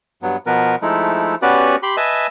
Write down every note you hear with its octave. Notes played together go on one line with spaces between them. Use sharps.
G2 F#3 B3
B2 F3 B3 A#4 B4
F3 G#3 A3 D#4 E4
B3 C#4 F#4 G4 B4 D5
G4 B5 C6
B4 D#5 E5 G#5 A5